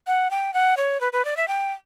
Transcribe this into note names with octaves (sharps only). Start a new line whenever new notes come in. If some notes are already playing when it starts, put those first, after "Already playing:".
F#5
G5
F#5
C#5
B4
B4
D5
E5
G5